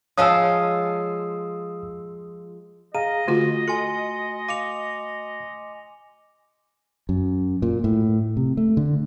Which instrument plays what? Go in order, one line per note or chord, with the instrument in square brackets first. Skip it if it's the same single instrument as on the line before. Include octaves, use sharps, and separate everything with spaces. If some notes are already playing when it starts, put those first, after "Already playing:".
[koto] F3 G#3 F4 [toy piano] C#5 F5 A5 [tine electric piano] D#6 E6
[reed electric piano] G#4 F5 A#5 [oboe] D#5 [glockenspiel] D#7
[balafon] D3 F4 [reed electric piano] A3 F#4
[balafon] A4 [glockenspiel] G#5 C6 C#7
[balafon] F5 [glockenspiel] D6 C#7 F7
[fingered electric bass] F#2
A#2
A2
C3
A3
D3